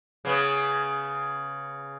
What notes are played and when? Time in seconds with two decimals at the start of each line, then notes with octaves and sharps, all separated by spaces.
0.25 C#3 B3